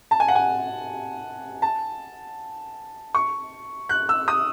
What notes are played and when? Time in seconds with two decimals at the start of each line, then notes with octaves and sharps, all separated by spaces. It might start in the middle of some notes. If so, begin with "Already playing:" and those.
0.11 A5
0.20 G#5
0.28 F#5
0.35 G#5
1.62 A5
3.15 C#6
3.89 F#6
4.09 E6
4.28 D#6